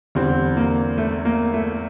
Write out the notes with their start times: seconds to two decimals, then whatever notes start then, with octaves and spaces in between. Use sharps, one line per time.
0.15 E2 D3 G3 C4
0.57 A#3
0.98 A3
1.25 A#3
1.54 A3